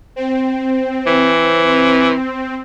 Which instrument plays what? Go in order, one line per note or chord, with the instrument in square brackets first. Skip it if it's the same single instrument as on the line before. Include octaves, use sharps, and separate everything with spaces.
[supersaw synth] C4
[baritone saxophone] E3